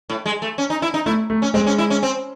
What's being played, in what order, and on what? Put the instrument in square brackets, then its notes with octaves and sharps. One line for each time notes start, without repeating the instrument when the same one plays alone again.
[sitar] A2
G#3
A3
C#4
D#4
E4
D#4
[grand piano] A3 [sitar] E4
[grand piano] A3
[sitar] C#4
[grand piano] G#3 [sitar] C4
[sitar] C#4
E4
C#4
C4